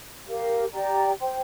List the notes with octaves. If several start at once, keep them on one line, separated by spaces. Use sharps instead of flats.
G4 A#4 F5
G4 D5 G5 A#5
C5 G5 C6